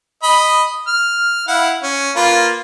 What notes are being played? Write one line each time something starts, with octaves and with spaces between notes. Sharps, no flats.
D#5 B5
F6
E4 F5 F#5
C#4
A#3 F4 B4